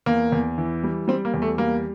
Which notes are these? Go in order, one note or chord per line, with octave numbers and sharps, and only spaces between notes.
E2 A#3
E2
E3
G3
G3 C4
A#3
E2
A3
G3 A#3